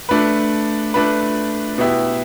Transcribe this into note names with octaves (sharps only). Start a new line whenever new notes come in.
A3 D4 B4
A3 D4 B4
B2 B3 E4 G4